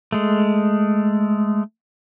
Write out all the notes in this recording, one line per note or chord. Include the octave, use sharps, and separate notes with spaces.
G#3 A3